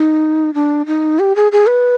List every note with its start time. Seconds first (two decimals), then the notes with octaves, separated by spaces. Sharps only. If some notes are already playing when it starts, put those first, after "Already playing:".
Already playing: D#4
0.54 D4
0.86 D#4
1.19 G4
1.36 G#4
1.52 G#4
1.68 B4